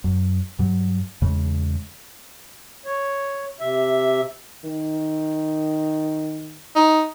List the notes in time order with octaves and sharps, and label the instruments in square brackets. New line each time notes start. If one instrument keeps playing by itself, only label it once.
[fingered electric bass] F#2
G2 F#3
E2 C#3 G#3
[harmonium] C#5
C3 E5
[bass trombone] D#3
[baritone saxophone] D#4